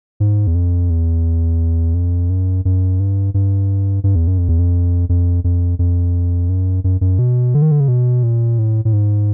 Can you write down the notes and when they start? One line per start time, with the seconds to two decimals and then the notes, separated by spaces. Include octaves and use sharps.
0.20 G#2
0.47 E2
0.55 F2
0.90 E2
1.94 F2
2.30 F#2
2.65 F#2
3.00 G2
3.34 G2
4.04 G2
4.15 E2
4.27 F#2
4.38 F2
4.49 E2
4.59 F2
5.09 F2
5.44 F2
5.79 F2
6.49 F#2
6.84 F#2
7.01 F#2
7.19 B2
7.54 D3
7.62 D#3
7.71 D3
7.80 C#3
7.88 B2
8.23 A#2
8.59 A2
8.85 A2
8.93 G#2